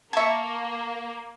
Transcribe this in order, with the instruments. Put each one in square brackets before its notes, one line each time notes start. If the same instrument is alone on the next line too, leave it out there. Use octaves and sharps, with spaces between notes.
[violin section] A#3 [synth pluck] E5 G#6 [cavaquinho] A5 C#6